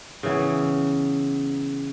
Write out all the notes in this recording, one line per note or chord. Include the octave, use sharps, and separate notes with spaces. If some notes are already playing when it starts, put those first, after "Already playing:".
C#3 E3 B3